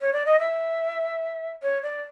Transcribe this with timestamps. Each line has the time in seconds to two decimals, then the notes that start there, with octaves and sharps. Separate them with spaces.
0.01 C#5
0.13 D5
0.26 D#5
0.39 E5
1.62 C#5
1.83 D5